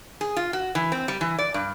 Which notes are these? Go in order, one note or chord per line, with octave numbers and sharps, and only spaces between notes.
G#4
F4
F#4
E3
C4
G3
E3
D5
G2